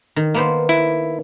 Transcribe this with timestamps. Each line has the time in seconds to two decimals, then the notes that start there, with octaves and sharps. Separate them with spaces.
0.16 D#3
0.34 A#3 B3 C5
0.69 E4